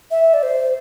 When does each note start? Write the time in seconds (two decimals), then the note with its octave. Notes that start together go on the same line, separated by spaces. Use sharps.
0.11 E5
0.34 D5
0.43 C5